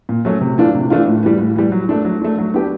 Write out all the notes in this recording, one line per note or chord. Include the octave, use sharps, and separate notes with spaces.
A#2
F#3 A3 C#4
C3
E3 A3 D4 F4
C3
E3 A3 D4 F4
A2
E3 G3
A2
E3 G3
F#3
A3 D4
F#3
A3 D4
F#3
B3 D4 G4